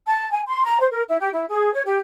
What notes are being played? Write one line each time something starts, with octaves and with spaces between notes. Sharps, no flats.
A5
G#5
C6
A#5
C5
A#4
E4
G4
E4
G#4
C#5
G4